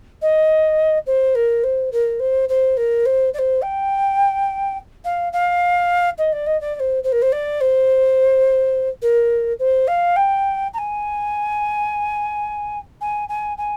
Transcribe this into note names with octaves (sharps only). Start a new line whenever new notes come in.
D#5
C5
A#4
C5
A#4
C5
C5
A#4
C5
D5
C5
G5
F5
F5
D#5
D5
D#5
D5
D5
C5
C5
A#4
C5
D5
C5
A#4
C5
F5
G5
A#5
G#5
G#5
G#5
G#5